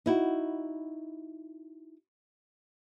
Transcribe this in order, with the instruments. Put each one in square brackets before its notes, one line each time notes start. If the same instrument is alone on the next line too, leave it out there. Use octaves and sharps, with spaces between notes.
[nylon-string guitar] D#4 E4 F#4